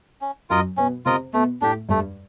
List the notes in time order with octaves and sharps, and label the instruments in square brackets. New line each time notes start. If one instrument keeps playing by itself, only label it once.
[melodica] C#4
[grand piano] F#2 F#3 [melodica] F4 A#4 D#5
[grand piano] B2 B3 [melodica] C#4
[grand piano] C3 C4 [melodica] F4 A#4 D#5
[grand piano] B2 B3 [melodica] A3
[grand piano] A2 A3 [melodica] D4 G4
[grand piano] G2 G3 [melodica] A3